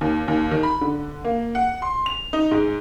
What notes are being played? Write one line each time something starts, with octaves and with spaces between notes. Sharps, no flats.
D#2
D#2
D#3
B5
D3
A#3
F#5
C6
F7
D#4
G#2